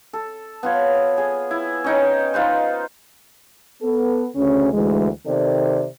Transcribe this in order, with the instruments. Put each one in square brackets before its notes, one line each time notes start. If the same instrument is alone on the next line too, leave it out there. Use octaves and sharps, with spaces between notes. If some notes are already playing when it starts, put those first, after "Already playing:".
[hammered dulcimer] A4
B3 F4 C#5
G#4
E4
C#4 D#4 G5
D#4 F4 B4 C5
[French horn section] B3 A4
D2 C#3 C#4
D2 E3 G#3
C3 D#3 C4 A4 D5